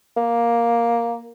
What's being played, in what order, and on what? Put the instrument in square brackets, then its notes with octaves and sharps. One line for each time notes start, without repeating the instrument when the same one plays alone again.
[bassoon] A#3